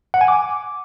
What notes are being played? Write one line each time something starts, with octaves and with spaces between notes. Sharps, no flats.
F#5
G#5
D6